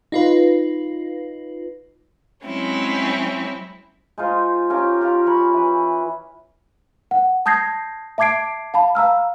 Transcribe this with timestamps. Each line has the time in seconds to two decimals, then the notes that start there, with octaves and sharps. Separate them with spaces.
0.12 D#4 F4 B4
2.44 F#3 G#3 C4 C#4 E4
4.18 G#3 D#4 F4 C5
4.70 C#4 F4 G4 A#4
5.01 F4 G4 A#4
5.26 A#4 C#5 B5
5.53 E3 B4
7.11 F#5
7.46 A5 D#6 G6 G#6 A#6 C7
8.18 E5 A5 D6 G#6 C7 D7
8.74 F5 A5 B5
8.95 F5 A#5 E6 F6